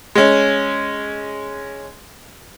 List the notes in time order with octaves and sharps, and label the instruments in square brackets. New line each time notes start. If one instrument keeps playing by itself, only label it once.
[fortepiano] G#3 C#4